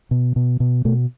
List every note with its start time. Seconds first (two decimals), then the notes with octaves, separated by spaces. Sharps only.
0.11 B2
0.36 B2
0.60 B2
0.85 B2 A3